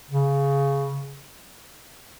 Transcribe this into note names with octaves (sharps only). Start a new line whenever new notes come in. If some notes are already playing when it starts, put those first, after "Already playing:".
C#3